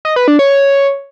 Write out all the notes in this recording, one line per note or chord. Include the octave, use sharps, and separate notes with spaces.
D#5
B4
D4
C#5
C#5